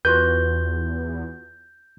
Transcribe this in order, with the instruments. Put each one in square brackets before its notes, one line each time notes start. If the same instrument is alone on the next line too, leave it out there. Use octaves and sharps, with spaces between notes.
[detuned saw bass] E2 [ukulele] F4 F#4 B4 [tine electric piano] G6